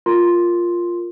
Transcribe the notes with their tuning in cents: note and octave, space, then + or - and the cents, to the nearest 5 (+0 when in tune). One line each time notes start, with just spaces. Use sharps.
F4 +0 A#4 +0 C6 +0